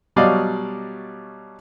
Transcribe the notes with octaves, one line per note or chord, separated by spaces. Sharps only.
B2 F#3 G3 D5 D#5 F5